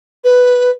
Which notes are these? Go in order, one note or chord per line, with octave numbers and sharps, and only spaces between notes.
B4